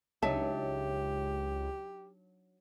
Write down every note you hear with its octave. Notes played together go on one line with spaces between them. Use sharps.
C#2 F#3 D4 D#4 G4 E5 A5